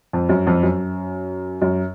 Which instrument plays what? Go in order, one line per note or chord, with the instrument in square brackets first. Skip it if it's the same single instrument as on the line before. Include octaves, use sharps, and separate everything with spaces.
[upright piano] F2
F#2
F2
F#2
F#2